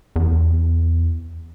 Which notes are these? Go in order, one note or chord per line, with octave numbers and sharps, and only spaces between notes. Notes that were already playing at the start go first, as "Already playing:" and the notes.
E2